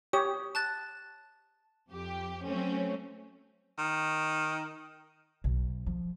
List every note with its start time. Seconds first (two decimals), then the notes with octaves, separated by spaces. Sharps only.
0.13 G4 C#5 D#6
0.55 A5 F#6 A6
1.90 F2 G4
2.46 F#3 A3 C4 C#4
3.78 D#3
5.44 B1
5.87 F3